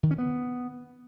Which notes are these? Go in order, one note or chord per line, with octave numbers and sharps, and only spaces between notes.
D#3
C#4
B3